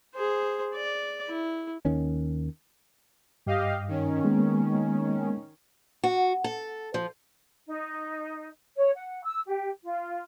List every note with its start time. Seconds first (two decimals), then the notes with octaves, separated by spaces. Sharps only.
0.15 G#4 C5
0.75 D5
1.28 E4
1.85 D#2 D#3 C#4
3.47 G2 G4 D#5 F5
3.88 D#3 C#4
4.25 G#3 A#3 B3
6.04 F#4
6.44 A4
6.94 F3
7.67 D#4
8.75 C#5
8.95 F#5
9.23 E6
9.45 G4
9.83 F4